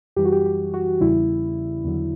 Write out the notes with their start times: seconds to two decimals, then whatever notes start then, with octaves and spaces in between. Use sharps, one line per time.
0.16 F#2 E3 G3 G4
0.25 F#4
0.32 G4
0.46 G4
0.74 F#4
1.01 E2 C#3 G3 E4
1.84 E2 D3 F#3